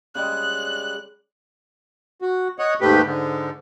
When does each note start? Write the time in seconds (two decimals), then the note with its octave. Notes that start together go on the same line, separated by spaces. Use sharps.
0.15 C#3 G3 G#3 F#6
2.22 F#4
2.59 C#5 D#5 F#5
2.81 D#2 G#2 A3 G4 B4
3.04 G#2 D3